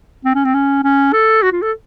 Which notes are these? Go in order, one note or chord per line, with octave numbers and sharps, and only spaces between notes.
C4
C#4
C4
C#4
C#4
A4
F#4
F4
A4